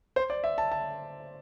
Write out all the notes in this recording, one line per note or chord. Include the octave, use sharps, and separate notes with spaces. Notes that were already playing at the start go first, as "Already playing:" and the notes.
C5
D5
E5
A5
A5